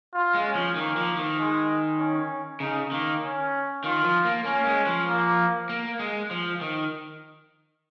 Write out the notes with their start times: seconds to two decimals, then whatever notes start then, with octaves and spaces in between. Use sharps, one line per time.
0.14 F4
0.35 G#3
0.45 C#4
0.55 F3
0.76 D#3 A#3
0.97 F3
1.17 D#3
1.38 G#3
1.99 C#4
2.60 C#3 D#4
2.92 D#3 A#3
3.23 C#4
3.84 D#3 F4
4.04 F3
4.25 A#3
4.46 A#3 C#4
4.67 G#3
4.86 F3
5.08 A#3
5.69 A#3
6.00 G#3
6.31 F3
6.61 D#3